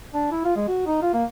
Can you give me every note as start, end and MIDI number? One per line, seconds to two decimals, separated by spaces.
0.14 0.26 62
0.31 0.41 64
0.45 0.52 65
0.56 0.64 56
0.68 0.87 66
0.87 0.99 63
1.02 1.14 65
1.14 1.24 58